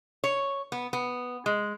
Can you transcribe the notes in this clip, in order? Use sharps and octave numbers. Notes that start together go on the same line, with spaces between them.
C#5
B3
B3
G#3